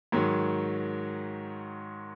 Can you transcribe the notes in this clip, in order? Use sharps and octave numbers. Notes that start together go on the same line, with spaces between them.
G#2 D#3 F#3